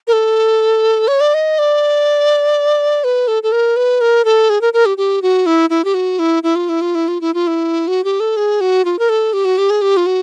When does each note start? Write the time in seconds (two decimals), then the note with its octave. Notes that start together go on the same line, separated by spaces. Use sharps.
0.07 A#4
0.13 A4
1.08 C#5
1.21 D5
1.34 D#5
1.59 D5
3.04 B4
3.28 A4
3.43 A4
3.52 A#4
3.76 B4
4.01 A#4
4.25 A4
4.50 G#4
4.61 A#4
4.73 A#4
4.86 G4
4.98 G4
5.22 F#4
5.46 E4
5.70 E4
5.85 G4
5.94 F#4
6.19 E4
6.43 E4
6.56 F4
6.69 E4
6.81 F4
6.95 E4
7.08 F4
7.21 E4
7.34 F4
7.47 E4
7.88 F#4
8.04 G4
8.20 A4
8.37 G#4
8.61 F#4
8.85 F4
8.99 A#4
9.09 A4
9.33 G4
9.45 F#4
9.58 G4
9.70 G#4
9.82 G4
9.97 F4
10.06 F#4